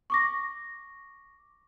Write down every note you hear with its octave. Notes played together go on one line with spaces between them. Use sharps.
C#6 D6 A#6